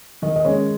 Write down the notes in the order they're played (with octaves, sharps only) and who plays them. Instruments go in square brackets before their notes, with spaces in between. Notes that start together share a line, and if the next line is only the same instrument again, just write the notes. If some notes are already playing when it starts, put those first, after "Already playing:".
[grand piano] D#3 [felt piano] D#4 D#5
[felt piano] D#5
[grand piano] G#3 [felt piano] C#4 C#5